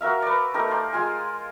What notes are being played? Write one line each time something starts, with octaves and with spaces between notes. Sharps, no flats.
F#4 A#4 E5 F5
B4 D5
A3 D#4 G4 A#4
A#4 C5 D5
G#3 F4 G#5